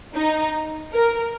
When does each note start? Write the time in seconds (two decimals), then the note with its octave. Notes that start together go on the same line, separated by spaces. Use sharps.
0.16 D#4
0.93 A#4